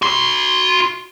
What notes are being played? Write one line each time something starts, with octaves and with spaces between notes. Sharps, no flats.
F#4 C6